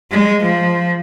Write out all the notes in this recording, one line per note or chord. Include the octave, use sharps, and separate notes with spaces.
G#3
F3